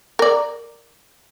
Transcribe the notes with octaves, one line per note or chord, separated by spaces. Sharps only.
A#4 D5